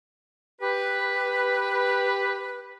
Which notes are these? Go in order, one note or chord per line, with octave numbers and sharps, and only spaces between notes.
G4 B4